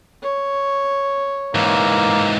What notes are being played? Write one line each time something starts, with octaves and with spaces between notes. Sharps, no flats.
C#5
G#2 E3 A#3